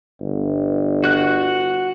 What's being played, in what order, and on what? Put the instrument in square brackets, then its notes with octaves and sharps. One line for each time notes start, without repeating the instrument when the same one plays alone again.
[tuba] G1
[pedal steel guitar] F#4 F#6